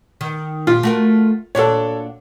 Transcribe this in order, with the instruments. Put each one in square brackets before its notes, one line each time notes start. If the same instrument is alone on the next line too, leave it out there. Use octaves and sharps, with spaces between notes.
[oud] D#3
[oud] A#2 G4 [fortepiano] F4
[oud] A3 F#4 A#4
[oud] A#2 D4 F#4 [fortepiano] A4 C#5